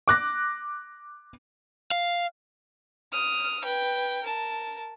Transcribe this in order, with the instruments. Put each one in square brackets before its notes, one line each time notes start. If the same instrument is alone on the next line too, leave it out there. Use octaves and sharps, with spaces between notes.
[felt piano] D6 F#6 A#6
[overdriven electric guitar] F5
[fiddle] D#6 F6
B4 G5
A#4 A5